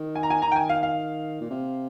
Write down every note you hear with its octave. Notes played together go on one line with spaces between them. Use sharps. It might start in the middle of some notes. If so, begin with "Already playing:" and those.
Already playing: D#3
G#5
A#5
G#5
D#3 A#5
G5
G#5
F5
F5
A#2
C3